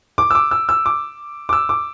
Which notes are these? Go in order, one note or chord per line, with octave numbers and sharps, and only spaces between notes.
D6
E6
D6
E6
E6
D6
D6
E6
D6